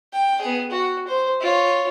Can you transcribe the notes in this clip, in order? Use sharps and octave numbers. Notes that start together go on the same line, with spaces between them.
G5
B3 G#4
F#4
C5
F4 C#5